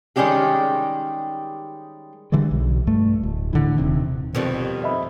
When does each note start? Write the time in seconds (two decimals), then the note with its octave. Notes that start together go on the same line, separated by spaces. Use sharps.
0.16 D#3 G3 G#3 C#4 G4 G#4
2.32 D3 E3 G3 G#3
2.51 B1
2.87 G2 A3
3.23 D1
3.53 A2 D3 E3
3.77 D#1 C3 D#3
4.35 F2 B2 D#3 G3
4.84 D#5 E5 B5